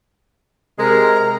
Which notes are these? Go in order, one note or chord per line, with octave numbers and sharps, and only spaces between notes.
C3 G#3 A#4 A#5